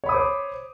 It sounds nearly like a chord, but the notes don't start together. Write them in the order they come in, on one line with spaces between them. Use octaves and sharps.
C#5 B5 D#6 D6 C5